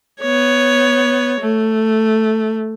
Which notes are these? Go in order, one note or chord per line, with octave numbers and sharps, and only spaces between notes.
B3 C#5
A3